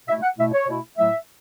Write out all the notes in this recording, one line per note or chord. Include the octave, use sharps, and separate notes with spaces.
B2 A3 E4 E5
F#5
B2 A3 E4 E5
C#5
B2 A3 E4
A2 F#3 A3 E4 E5